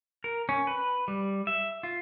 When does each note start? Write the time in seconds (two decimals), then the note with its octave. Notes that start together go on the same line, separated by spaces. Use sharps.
0.24 A#4
0.49 C#4
0.67 B4
1.08 G3
1.47 E5
1.83 F4